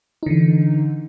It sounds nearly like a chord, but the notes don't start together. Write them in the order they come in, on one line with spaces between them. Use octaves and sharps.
D#4 D3 E3